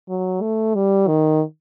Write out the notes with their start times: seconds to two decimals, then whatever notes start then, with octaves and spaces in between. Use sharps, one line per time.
0.09 F#3
0.42 A3
0.75 G3
1.08 D#3